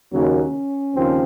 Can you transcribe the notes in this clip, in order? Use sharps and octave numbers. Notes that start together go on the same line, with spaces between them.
D#2 C#3 F#3 A#3 C#4
D#2 C#3 F3 C4